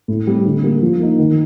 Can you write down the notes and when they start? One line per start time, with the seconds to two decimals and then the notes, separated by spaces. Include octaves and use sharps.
0.08 A2
0.27 G3 C4
0.45 D3
0.63 G3 A#3
0.81 F3
0.99 A#3 D#4
1.19 D#3